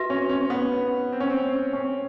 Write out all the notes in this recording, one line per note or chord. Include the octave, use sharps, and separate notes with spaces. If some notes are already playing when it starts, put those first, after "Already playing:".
Already playing: F#4 B4 E5
C#4
C#4
B3
C4
C#4
C4
C#4